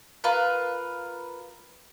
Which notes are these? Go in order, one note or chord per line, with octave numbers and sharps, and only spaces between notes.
F4 A#4 B4